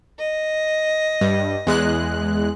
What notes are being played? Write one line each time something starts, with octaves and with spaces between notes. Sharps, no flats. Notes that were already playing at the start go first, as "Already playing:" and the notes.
D#5
G2
E2 G#3 F#6